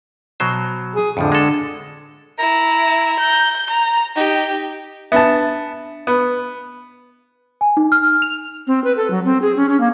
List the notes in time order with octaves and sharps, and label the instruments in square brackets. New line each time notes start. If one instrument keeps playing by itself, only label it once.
[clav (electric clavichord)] B2 F#3 C5
[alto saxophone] G#4
[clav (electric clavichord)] F2 A2 F3 [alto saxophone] D3
[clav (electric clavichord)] G#3 A4
[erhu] E4 [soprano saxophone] A#5
[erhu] G6
A#5
[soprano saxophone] D#4 [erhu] G4
[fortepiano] B3 A5 [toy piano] D4 E5
[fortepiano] B3
[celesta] G#5
D#4
F6
F6
F7
[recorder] C4
B4
A4
F#3
C4
G#4
C#4
C#4
A#3